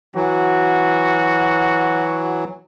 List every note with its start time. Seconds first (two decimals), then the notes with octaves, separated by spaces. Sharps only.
0.15 E3 F#3 F#4